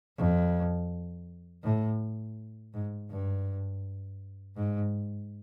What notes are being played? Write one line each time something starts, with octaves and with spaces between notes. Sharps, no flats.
F2
A2
G#2
G2
G#2